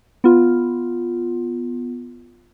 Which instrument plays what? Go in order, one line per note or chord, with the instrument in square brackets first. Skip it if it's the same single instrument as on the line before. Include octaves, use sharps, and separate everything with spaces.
[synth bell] B3 F4